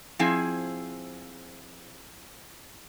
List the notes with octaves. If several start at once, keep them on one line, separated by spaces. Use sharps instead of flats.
F3 C4 E4 G#4